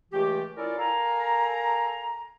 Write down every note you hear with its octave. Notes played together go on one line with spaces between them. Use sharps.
C#2 E3 G#3 A3 G4
C#4 E4 F4 A4 A#4 D5
A4 A#4 F5 G#5 A#5